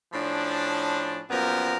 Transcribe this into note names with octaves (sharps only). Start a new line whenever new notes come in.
A2 F3 C#4 D4
F#2 A#2 F3 B3 G4 A#4